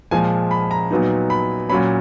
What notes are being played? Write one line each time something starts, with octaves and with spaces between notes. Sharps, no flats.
A#2 F3 G#3 G#5
B5
A#5
A#2 F#3 B3 D#4
B5
A#2 F#3 C#4 B5